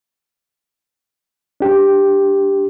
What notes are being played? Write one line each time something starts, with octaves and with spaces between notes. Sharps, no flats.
D4 G4